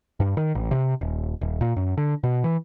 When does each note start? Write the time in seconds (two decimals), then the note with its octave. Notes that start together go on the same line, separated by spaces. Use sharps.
0.20 G2
0.37 D#3
0.55 A1
0.71 C3
1.01 D#1
1.41 D#1
1.61 A#2
1.76 F#2
1.97 D3
2.23 B2
2.44 E3